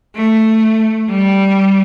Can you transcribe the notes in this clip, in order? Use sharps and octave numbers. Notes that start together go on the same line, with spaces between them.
A3
G3